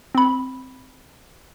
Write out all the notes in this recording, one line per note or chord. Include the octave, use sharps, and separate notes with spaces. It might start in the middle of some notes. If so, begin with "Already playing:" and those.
C4 B5